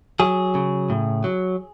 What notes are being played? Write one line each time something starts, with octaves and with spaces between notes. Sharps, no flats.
F#3 G#4
C#3
A2
F#3